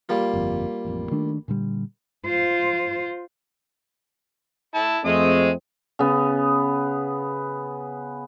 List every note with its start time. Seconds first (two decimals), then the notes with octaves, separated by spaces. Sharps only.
0.09 G3 A#3 F4
0.33 G1 F2
0.85 A1 F2
1.11 D#3 A3 D4
1.48 A#2 D3 G3
2.26 F4 C5
4.75 E4 A5
5.05 F2 G#3 A3 C4 D#6
5.99 C#3 B3